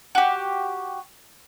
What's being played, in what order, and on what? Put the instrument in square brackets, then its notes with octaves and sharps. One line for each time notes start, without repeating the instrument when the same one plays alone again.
[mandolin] F#4 G4